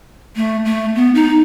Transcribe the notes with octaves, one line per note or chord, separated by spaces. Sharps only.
A3
A3
B3
D#4